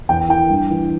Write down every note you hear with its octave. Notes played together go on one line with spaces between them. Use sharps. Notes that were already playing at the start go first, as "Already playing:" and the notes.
E2 G5
E3 G5
G2
E3